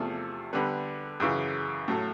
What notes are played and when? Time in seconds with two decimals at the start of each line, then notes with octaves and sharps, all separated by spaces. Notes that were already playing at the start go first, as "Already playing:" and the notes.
Already playing: E2 C3 F3 A3
0.53 D3 G3 B3
1.20 F#2 C#3 E3
1.88 A2 F#3 A3